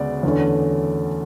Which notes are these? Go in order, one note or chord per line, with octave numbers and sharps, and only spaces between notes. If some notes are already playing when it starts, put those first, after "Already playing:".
Already playing: D2 C#3 G#3 B3 D5
E2 D3 A3 C#4